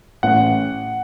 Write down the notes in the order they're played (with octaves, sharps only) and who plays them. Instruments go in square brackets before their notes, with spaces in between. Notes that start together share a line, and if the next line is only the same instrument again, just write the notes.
[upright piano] A1 [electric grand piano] F#5